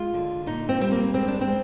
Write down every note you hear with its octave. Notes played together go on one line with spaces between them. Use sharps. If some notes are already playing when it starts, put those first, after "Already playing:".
Already playing: G#3 F4
D3
A#2 D#4
C4
G3 C4
A#3
G#3 C4
D4
C4
G#3